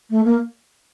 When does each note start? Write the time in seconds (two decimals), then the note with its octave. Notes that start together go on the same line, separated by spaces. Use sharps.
0.10 A3
0.25 A#3